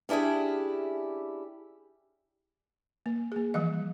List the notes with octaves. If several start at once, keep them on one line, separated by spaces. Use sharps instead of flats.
C#4 D4 E4 G4 G#4
A#3
A#3 G#4
E3 F3 G3 D#5